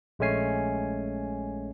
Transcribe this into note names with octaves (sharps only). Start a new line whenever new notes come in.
A#1 G#3 A3 C#4 G#5 C7